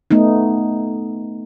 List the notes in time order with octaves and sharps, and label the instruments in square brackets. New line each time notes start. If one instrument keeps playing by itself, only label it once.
[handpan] A3 B3 D#4